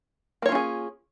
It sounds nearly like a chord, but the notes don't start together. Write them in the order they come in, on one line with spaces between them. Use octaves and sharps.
A#3 C#5 F4 C#4 G#4